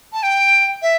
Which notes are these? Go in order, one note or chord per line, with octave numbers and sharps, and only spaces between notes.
A5
G5
E5